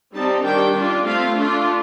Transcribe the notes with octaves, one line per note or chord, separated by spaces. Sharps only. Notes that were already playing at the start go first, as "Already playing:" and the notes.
G3 C4 D#4 A5
D#3 G3 D4 G5
G3 D4 F4
A3 C4 F4 F5
A3 D4 F4